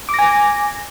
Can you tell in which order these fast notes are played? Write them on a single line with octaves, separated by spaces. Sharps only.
D6 A#6 G#5